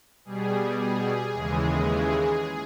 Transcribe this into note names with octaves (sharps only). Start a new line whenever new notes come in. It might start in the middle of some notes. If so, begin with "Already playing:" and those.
B2 G3 G#4
G#4
D#2 C#3 E3 G#3